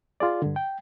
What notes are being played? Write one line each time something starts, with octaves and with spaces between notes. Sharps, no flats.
F4 G#4 D5
G2 D3
G5